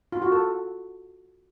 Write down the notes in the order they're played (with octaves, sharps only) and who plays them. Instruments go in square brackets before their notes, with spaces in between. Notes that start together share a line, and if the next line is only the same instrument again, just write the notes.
[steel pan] F4
F#4
A4